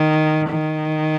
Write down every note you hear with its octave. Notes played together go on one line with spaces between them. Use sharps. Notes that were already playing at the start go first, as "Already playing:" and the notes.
Already playing: D#3
D#3